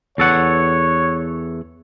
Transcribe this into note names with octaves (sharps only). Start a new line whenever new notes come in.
E2 A4 C#5 F#5